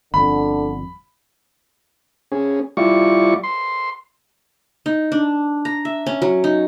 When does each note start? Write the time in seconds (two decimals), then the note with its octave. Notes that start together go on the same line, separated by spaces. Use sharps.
0.14 G1 F2 D3 B5
2.32 C#4 G#4
2.77 G3 E4 F4 D5 C#6
3.43 C6
4.86 D#4
5.12 D4
5.65 A#5
5.85 E5
6.06 C#4
6.22 F#3
6.44 D#4